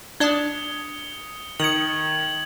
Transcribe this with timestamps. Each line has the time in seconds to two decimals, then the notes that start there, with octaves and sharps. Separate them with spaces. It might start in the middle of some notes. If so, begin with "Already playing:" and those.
0.20 D4 D5 A5 D#6 G#6 C#7 G7
1.60 D#3 D#6 G#6 C#7 F7 F#7